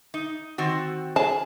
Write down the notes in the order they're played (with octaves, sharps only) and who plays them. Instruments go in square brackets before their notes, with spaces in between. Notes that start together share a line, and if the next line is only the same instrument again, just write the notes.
[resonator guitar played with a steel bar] D#4
D#3 C4 F#4
[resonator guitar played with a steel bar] G#4 [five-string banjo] A5